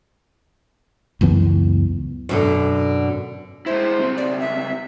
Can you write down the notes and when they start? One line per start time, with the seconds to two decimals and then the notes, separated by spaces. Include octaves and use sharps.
1.21 C#2 F#2 E3 B3
2.29 F#2 B2 D3
3.66 G#3 E4 C5
4.00 C#2 C4
4.17 D5
4.40 E5